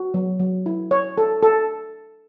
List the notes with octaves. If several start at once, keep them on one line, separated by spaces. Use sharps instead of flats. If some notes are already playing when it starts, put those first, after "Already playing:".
Already playing: F#4
F#3
F#3
E4
C#5
A4
A4